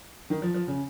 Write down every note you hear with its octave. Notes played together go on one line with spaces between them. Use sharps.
D#3
F3
F3
C#3